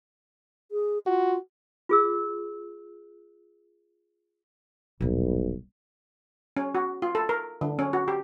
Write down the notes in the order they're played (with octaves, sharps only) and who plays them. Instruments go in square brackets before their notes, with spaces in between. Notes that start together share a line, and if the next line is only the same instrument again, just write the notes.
[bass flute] G#4
[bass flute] F4 [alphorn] F#4
[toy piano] F4 G#4 E6
[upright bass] D#1 B2 [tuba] B1
[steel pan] C#4
F#4
F4
A4
A#4
D3
C#4
F#4
G4